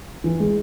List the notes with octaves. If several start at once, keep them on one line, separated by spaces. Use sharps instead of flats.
E3
G#3